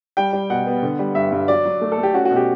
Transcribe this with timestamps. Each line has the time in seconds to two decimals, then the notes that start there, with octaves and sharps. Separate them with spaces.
0.17 G3 G5
0.33 G3
0.50 B2 F#5
0.67 B3
0.82 D3
0.99 G3
1.15 G2 E5
1.32 G2
1.48 F#3 D5
1.66 F#3
1.81 A3
1.92 A4
1.98 A3
2.03 G4
2.14 C#4 F#4
2.25 F#4
2.30 B2
2.36 G4